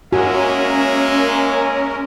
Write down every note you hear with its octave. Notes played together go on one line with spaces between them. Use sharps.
G#3 A#3 C#4 F#4 A#4 E5